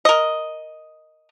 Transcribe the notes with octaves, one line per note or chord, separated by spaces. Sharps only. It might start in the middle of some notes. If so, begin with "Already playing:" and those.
A#4 D#5